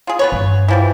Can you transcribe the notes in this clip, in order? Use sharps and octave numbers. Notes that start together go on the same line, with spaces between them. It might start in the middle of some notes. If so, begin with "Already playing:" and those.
F4 G#4
B3 B4 C#5
G2
E3 F3 G3